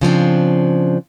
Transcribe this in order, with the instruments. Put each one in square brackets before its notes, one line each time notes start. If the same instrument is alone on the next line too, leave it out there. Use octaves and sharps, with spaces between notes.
[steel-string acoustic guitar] C#3 F3 C4 D4